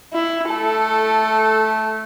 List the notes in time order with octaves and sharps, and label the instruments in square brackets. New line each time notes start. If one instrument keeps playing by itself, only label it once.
[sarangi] E4
[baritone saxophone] A3 [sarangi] A4